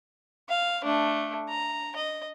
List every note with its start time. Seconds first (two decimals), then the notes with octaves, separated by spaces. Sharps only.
0.49 F5
0.84 A3 D4
1.49 A#5
1.96 D#5